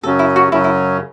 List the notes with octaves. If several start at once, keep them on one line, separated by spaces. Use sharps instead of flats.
F#2 C#3 F#3 C#4 A4
E4
F#4
F#2 C#3 F#3 C#4 E4
E4